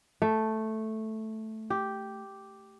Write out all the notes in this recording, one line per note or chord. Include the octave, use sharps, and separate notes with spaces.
A3
G4